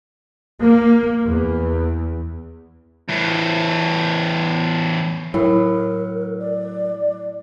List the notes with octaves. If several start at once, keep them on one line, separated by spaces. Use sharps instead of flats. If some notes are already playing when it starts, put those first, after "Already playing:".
A#3
E2
E2 A2
A2 F#3 A#4
D5